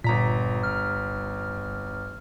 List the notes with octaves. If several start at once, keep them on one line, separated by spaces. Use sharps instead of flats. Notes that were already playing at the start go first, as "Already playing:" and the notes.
G1 A#2 A#5 B6
F6